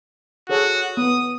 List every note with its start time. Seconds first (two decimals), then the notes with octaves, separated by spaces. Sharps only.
0.49 F#4 G#4 A4 C#5
0.97 B3 D#6